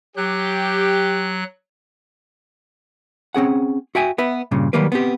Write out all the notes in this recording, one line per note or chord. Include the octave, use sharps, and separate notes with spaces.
F#3 G4 F#6
C4 C#4 G#4 F#5
F#4 E5 G5 G#5
B3 B4 E5
G2 A#2 C#3
D#3 F#3 G3 A#3 B4
B3 C4 G4